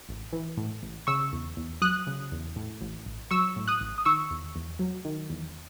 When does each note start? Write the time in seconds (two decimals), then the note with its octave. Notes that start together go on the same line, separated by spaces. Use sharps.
0.09 A1
0.33 E3
0.57 A2
0.83 A1
1.07 C#3 C#6 E6
1.33 E2
1.57 E2
1.82 F#3 D#6 F#6
2.07 C#3
2.32 E2
2.56 A2
2.81 A1
3.06 A1
3.31 F#3 C#6 E6
3.56 A2
3.68 D#6 F#6
3.81 A1
3.98 D#6
4.05 D#3 C#6 E6
4.31 E2
4.56 E2
4.79 F#3
5.05 D#3
5.30 E2